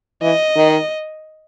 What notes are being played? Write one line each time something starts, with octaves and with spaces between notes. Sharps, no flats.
E3 D#5
D#3